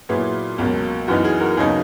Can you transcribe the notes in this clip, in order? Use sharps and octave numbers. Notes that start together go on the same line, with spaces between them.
A#2 F#3 B3 E4 G#4 B4
C#2 B2 F#3 A#3
F#2 E3 B3 D#4 F#4
G#4
F#4 A#4
D#2 C#3 F#3 B3 D#4 G#4